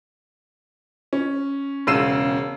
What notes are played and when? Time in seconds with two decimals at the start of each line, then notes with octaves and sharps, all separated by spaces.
1.13 C#4
1.87 E1 C#3 E6 C7 D#7 E7